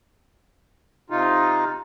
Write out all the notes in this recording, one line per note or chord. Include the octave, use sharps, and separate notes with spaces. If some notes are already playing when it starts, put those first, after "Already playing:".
C3 D#4 F4